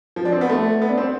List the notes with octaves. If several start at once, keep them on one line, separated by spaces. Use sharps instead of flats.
F3
D4
C4
B3
A3
B3
D4
C4